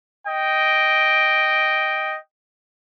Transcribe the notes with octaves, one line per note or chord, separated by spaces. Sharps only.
D#5 G5